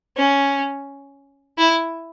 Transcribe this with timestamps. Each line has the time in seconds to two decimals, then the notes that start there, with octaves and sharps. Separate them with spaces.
0.17 C#4
1.58 E4